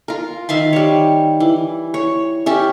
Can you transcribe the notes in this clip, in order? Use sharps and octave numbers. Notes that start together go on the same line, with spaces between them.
F4 A#4
D#3 E5 F5 C6
G3 C#5
E3
C#5
C#4 G4 E5